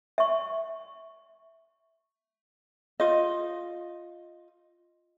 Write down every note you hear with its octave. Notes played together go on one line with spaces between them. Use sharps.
E5 C#6
F4 D#5